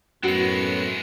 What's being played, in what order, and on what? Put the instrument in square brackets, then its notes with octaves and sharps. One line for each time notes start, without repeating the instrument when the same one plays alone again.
[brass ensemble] F#2 A2 [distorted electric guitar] G#3 C4 [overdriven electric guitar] B3 [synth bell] F#4 C#7